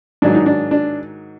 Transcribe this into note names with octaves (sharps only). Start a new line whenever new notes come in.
G#2 D#3 F#3 D4
D#4
D4
D4